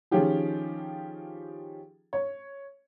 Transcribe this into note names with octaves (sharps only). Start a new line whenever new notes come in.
D#3 F3 C#4 F4 G4 G#4
C#5